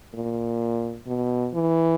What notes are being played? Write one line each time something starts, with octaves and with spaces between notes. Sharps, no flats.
A#2
B2
E3